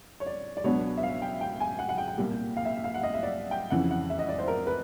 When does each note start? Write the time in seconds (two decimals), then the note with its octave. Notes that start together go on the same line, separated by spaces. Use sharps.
0.20 C#5
0.26 D5
0.57 D5
0.64 C#2 B2 F#3 B3 D4 C#5
0.97 E5
1.03 F5
1.22 G5
1.41 G5
1.60 G#5
1.79 F#5
1.89 F#5
1.98 G5
2.08 G5
2.18 C2 A#2 G3 A#3
2.57 F5
2.65 E5
2.84 F5
2.94 F#5
3.03 D#5
3.14 E5
3.23 D5
3.51 G5
3.70 F2 C#3 E3 F#5
3.91 F#5
4.10 E5
4.19 D#5
4.29 D5
4.39 C5
4.48 A#4
4.67 B4